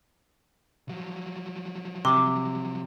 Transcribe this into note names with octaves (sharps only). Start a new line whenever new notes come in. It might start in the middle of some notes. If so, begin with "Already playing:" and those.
F3 F#3
C3 D6